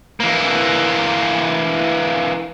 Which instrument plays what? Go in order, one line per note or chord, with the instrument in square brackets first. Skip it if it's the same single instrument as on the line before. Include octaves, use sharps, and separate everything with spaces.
[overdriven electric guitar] E3 A#3